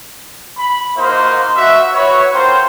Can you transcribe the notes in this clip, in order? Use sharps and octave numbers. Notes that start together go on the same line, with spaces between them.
B5
A#3 D#4 F4 F#4 A#4 C5
F#4 E5
E4 F#4 B4 C#5
C4 F4 A#4 C5